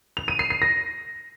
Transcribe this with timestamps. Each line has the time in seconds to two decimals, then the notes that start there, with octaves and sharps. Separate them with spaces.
0.17 F7
0.28 D#7
0.39 C7
0.50 C7
0.62 A#6